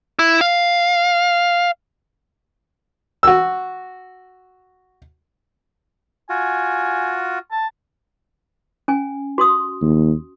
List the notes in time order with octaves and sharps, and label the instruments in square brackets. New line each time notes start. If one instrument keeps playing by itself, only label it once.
[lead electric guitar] E4
F5
[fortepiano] F#4 E6
[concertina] F4 F#4 [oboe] G#5
[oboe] A5
[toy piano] C#4 G#5
F#4 C6 D#6
[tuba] D#2